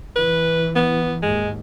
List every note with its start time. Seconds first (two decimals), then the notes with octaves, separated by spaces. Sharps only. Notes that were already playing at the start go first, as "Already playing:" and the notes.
0.16 E3 B4
0.76 B3
1.23 D#2 G#2 G#3